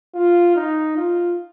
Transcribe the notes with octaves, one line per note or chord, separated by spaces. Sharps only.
F4
D#4
F4